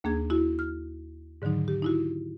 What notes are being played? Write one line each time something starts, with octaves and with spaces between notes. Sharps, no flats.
D#2 A#3 D4 G#4 G#6
E4 F#4
F6
G#2 D3 D#3 F#3 D#4
G4
D#4 E4 F#4